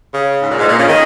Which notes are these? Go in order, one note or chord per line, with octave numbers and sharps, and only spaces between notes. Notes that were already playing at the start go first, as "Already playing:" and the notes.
C#3
G#2
A#2
G#2
A#2
C#3
D#3